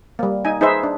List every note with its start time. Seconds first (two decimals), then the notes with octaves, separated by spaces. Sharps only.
0.19 G3 A#3
0.45 D#4 G#5
0.61 D#4 G#4 B4 C5 E5
0.83 D4